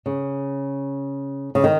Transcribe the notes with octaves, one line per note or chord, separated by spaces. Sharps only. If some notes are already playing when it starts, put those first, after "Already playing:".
C#3
C#3
D#3